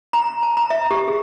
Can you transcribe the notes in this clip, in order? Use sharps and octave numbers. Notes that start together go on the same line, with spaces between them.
A#5
A5
A#5
E5
G4
G#4